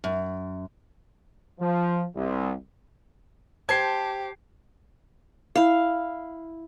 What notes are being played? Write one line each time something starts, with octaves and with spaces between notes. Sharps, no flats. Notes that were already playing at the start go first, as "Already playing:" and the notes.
F#2
F3
C2
G4 C5 A5 G#6 C7
E4 F5